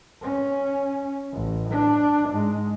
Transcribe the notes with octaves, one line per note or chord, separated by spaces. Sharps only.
C#4
A1
D4
G#2 G#3